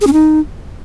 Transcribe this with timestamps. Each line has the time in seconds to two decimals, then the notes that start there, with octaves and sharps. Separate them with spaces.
0.01 G#4
0.07 C#4
0.13 D#4